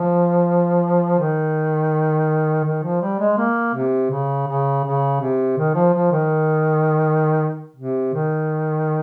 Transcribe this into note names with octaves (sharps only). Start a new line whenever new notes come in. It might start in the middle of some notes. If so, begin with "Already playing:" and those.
Already playing: F3
D#3
D#3
F3
G3
G#3
A#3
C3
C#3
C#3
C#3
C3
D#3
F3
F3
D#3
C3
D#3